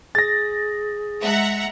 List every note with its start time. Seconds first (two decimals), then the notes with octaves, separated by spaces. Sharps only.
0.15 G#4 A6 A#6
1.22 G#3 E5 F#5 A#5